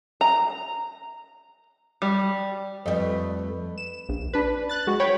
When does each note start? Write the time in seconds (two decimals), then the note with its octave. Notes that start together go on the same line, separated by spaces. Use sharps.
0.21 A#5
2.02 G3
2.86 F2 G3 A3 B4 D#5
3.78 E7
4.09 A#1
4.33 D4 B4
4.69 F#6 A6
4.87 G#3 F#4
5.00 C#5 G5 B5